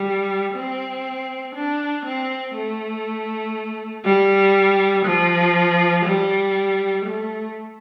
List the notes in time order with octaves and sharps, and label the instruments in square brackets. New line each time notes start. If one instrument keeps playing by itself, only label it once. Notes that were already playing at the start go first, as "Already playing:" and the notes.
Already playing: [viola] G3
C4
D4
C4
A3
G3
F3
G3
A3